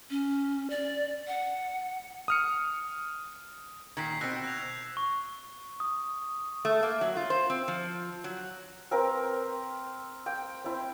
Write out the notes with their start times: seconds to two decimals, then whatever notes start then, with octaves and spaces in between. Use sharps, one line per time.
0.10 C#4
0.70 D5
1.27 F#5
2.28 D#6 F6 C#7
3.97 A#2 D#3 G#6 B6 C7
4.21 B2 C4 E6 F#6 A#6
4.44 F#6 G6 F7
4.97 C#6
5.80 D#6
6.65 A3
6.83 A#3
7.01 F#3
7.17 F4
7.30 C5
7.50 C4
7.68 F3
8.24 F#3
8.91 C4 A#4 B4
10.26 G5
10.64 C4 E4